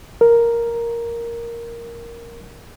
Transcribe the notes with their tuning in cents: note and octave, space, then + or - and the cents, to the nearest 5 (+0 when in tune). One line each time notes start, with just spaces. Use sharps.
A#4 +0